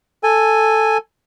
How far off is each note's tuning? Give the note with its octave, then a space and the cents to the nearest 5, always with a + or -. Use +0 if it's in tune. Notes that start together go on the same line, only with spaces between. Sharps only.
A4 +0 G#5 -5